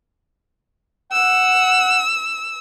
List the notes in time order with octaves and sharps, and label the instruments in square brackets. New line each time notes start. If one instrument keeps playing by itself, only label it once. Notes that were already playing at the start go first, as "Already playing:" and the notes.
[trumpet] F#5 [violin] E6